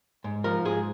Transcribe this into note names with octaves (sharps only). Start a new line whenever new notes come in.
G#2
F3 A#4
G#2 G#4